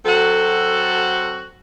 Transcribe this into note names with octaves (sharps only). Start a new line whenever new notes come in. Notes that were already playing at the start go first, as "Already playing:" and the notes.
F#3 C4 F#4 A4